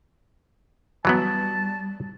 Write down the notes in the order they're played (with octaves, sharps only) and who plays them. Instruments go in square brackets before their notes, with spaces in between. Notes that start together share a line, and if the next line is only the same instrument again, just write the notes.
[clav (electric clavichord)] E3 F#3 B3 [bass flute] G3 [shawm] A5